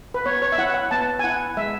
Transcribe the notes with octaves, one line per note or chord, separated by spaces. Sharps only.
B4
B3 C#5
C#5
E5
E4 F#5
F#5
B3 A5
G#5
E4 F#5
G#3 E5